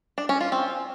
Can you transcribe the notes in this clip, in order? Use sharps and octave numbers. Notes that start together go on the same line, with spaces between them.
D4
C#4
F4
C4